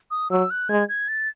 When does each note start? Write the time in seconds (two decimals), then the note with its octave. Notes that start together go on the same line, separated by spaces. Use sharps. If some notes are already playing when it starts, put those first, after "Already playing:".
0.11 D#6
0.31 F#3 E6
0.50 F#6
0.69 G#3 G#6
0.89 G#6
1.08 A6